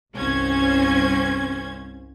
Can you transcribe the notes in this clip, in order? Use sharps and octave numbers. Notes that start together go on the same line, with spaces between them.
G1 C2 C#4 C5 G#6